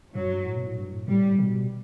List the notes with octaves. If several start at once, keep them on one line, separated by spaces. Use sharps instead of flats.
F#2 F#3
G2
A2
B2
A2
G2
A2
A2 G3
B2